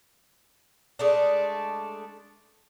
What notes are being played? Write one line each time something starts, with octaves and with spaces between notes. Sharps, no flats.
G#3 A3 D4